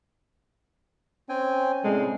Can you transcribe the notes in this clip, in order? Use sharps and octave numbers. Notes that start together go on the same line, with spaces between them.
C4 C#4 G5 G#5
A2 C3 G3 G#3 C4 A4